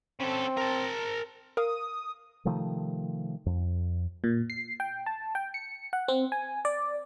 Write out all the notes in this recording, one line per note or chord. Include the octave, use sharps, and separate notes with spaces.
C#3 C4 A4
A#4 A5
A#4 F5 D#6
C3 D#3 F3 A3
F2
A#2
C7
G5
A5
G5
C#7
F#5
C4
G#5
D5